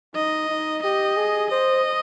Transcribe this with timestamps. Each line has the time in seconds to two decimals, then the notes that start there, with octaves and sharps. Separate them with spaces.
0.15 D#4 D#5
0.49 D#4
0.83 G4 D#5
1.17 G#4
1.50 C5 D#5